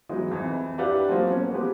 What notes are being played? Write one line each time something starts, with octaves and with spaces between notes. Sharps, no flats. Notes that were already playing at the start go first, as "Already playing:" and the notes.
E3 F#3 G#3 B3 D#4
F2 E3
D4 E4 G4 B4 F5 F#5
F3 F#3 G#3 A#3 C4 F#4
B3 C#4
F3 G#3 B3 G4 B4